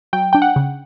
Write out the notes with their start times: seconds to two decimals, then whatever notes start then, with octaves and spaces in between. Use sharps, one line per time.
0.13 F#3 G5
0.33 D4 G5
0.42 F#5
0.56 C#3